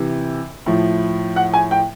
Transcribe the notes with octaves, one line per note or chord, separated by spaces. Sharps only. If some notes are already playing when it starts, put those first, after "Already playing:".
Already playing: C3 E3
A2 F3
F#5
G#5
G5